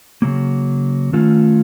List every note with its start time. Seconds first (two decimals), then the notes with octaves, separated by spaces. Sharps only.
0.22 C#3 F#3 A#3
1.13 D#3 A3 C#4 F4